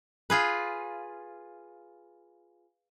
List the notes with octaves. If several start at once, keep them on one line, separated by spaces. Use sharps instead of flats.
F4 G#4 B4